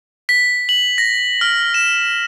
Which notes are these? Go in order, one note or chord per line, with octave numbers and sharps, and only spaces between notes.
B6
F#7
A#6
F6
E7